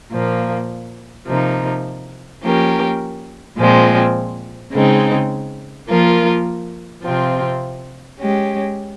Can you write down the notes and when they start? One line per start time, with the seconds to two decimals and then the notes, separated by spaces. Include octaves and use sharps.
0.11 A#2 F3 A#3
1.26 C3 F3 A#3 D#4
2.42 F3 A#3 C#4 G4 A#4
3.57 A#2 F3 G#3 C4
4.72 C#3 G#3 C4 D#4
5.87 F3 A#3 F4 A#4
7.03 C3 F3 C4 F4
8.18 G#3 C#4 G4